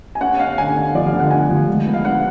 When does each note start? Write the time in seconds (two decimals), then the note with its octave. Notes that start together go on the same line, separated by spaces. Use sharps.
0.15 G#5
0.21 C#4 F#5
0.39 C#4 F5
0.58 D3 G#5
0.76 D3
0.95 F3 D5
1.06 F5
1.13 D3
1.20 F#5
1.31 D3 G#5
1.50 F3
1.68 G#3
1.87 B3
1.94 F5
2.04 D4 F#5